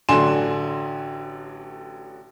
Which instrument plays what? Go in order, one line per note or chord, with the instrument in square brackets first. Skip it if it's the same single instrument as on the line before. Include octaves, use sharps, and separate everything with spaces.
[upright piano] A1 D3 F#3 G#5 C6 E7